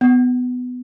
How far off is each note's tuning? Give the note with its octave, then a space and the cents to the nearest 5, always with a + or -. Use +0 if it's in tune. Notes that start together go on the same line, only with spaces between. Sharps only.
B3 +15